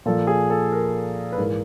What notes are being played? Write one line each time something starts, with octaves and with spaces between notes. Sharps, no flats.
A#2 F3 A4
G#4
A4
A#4
B4
G#2 E3 A#4